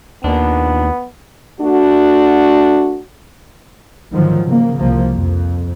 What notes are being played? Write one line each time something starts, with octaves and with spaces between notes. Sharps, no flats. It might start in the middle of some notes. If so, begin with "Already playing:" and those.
D#2 A#2 B3 D4
A3 D4 F#4
G#2 D3 D#3 F3 F#3
C#3 A#3
C2 F3 A#3
F2